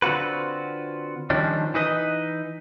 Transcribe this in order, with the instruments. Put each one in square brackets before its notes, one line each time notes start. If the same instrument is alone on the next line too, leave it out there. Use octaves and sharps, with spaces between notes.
[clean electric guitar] D3 C4 F4 F#4 B4
D#3 F3 G3 C#4 D4
E3 D#4 B4 D#5